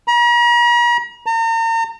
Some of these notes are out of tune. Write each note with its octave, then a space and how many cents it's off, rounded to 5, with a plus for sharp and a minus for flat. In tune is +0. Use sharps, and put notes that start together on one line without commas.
A#5 +45
A#5 -40